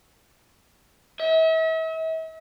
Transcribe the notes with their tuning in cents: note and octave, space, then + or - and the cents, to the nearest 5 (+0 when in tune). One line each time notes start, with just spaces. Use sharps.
E5 -40